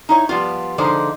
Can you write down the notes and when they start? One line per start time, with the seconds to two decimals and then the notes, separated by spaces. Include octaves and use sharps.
0.09 D#4 E4 C#5
0.29 F3 G3 B3 F4
0.78 D3 F3 G#3 D#4 C5